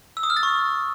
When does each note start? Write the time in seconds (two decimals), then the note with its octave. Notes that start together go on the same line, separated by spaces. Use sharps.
0.17 E6
0.23 D#6
0.30 F6
0.36 A6
0.43 C#6